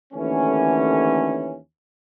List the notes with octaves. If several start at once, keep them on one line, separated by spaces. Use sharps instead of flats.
D#2 D3 E3 A3 C#4